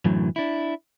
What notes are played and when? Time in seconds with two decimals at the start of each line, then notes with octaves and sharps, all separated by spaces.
0.05 F#2 A2 D3 E3 F#3
0.36 D4 E4